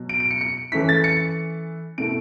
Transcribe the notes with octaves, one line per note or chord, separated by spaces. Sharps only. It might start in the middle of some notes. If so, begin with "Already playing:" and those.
Already playing: B2 F#3
D7
D7
C#7
C#7
E3 A3 C#4 E4 B6
A6
C#7
B2 A3 E4 D7